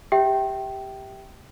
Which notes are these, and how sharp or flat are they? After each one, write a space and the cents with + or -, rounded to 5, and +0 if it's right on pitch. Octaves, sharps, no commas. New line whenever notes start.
G4 +0 E5 -10 G5 -15